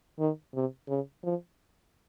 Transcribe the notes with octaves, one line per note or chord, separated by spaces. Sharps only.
D#3
C3
C#3
F3